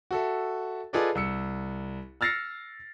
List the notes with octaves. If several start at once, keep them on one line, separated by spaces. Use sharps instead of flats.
F#4 A4 E5
F4 G#4 A4 B4 D5 D#5
C2 E6 C#7
E6 F6 A6 A#6 C7 C#7